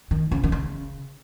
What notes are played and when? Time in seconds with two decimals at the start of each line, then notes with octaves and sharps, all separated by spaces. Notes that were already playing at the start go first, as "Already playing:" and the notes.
0.11 D#3
0.32 C#3
0.43 D#3
0.52 C#3